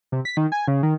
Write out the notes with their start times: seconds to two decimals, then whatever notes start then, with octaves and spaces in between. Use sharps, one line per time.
0.12 C3
0.25 B6
0.37 D#3
0.52 G#5
0.68 C#3
0.83 D#3